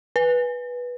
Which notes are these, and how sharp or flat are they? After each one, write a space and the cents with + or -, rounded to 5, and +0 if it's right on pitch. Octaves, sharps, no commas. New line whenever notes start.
B4 -10